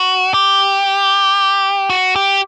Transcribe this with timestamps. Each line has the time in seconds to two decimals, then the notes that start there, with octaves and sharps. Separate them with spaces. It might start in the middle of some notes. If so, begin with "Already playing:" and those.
Already playing: F#4
0.34 G4
1.90 F#4
2.16 G4